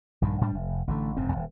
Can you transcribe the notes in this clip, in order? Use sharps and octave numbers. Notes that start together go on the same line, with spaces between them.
A#1 G2 D#3
G#2 G3 D4
F1
A1 D3 A3
F1 G#2 C#3 C4
D#1 C2